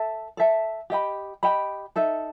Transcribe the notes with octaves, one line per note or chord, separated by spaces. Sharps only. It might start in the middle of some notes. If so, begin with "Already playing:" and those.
Already playing: A4 E5 A5
A4 E5 A5
G4 D#5 G5 B5
G4 D#5 G5 B5
D#4 A4 E5